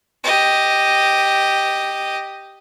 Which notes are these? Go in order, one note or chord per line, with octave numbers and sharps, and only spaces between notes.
G4 D#5